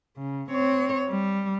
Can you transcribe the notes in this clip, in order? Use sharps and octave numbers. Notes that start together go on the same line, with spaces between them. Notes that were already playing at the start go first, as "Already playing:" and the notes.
C#3
C4 C#5
G3